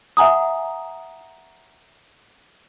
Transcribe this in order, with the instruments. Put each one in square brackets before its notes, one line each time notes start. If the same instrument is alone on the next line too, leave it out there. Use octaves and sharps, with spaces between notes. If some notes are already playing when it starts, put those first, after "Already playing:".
[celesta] E5 F#5 G#5 A#5 D#6